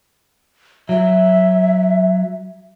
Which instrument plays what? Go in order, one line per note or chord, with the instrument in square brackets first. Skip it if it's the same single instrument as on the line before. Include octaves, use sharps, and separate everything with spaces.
[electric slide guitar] F#3 [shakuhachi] E5